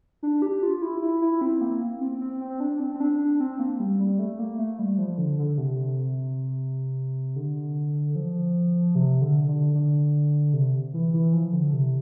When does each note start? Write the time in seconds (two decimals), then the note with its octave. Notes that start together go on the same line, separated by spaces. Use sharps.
0.23 D4
0.42 G4
0.63 F4
0.82 E4
1.02 E4
1.21 E4
1.41 C4
1.61 A#3
2.01 C4
2.21 C4
2.41 C4
2.60 D4
2.80 C4
2.94 C4
3.00 D4
3.20 D4
3.40 C4
3.59 A#3
3.80 G3
3.99 G3
4.19 A3
4.39 A#3
4.59 A3
4.79 G3
4.98 F3
5.18 D3
5.38 D3
5.58 C3
7.36 D3
8.15 F3
8.95 C3
9.21 D3
9.48 D3
9.74 D3
10.53 C3
10.93 E3
11.13 E3
11.33 F3
11.53 D3
11.73 C3